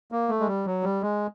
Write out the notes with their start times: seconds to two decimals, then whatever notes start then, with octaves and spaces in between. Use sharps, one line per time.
0.12 A#3
0.29 A3
0.40 G#3
0.47 G3
0.66 F#3
0.83 G3
1.02 G#3